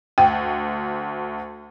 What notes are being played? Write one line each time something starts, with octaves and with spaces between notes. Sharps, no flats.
D2 G5